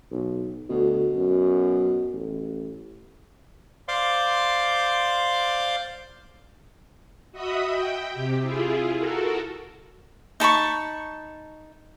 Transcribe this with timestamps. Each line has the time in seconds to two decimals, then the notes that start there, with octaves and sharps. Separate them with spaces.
0.11 B1
0.70 D2 B2
1.14 F#2
2.13 A1
3.88 C5 D5 F5 C6 D6
7.32 F#4 D#5 E5 B5 D#6
7.70 G5
8.12 C3 G4
8.42 E4 F4 G#4
8.98 F#4 A4 A#4
10.40 D#4 A5 B5 C#6